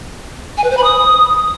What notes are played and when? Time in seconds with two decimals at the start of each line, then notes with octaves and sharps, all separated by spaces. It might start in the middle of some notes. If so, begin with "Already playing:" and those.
0.57 G#5
0.64 B4
0.71 C5
0.77 B5
0.84 D#6